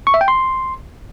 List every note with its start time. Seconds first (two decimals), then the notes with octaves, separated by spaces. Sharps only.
0.07 C#6
0.14 E5
0.21 G5
0.28 C6